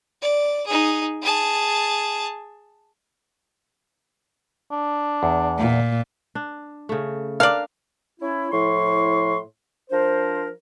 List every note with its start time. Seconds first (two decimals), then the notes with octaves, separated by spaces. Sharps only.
0.22 D5
0.67 D#4 G#4
1.22 G#4 A5
4.71 D4
5.23 E2
5.58 A#2
6.35 D4
6.89 C#3 A3
7.40 D4 A#4 D5 F5
8.20 C#4 E4
8.52 A2 F3 E4 C6 C#6
9.90 F3 D4 A#4 C5